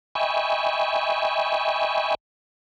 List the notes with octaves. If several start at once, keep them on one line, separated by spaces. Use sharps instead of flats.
D#5 E5 G5 G#5 B5 C#6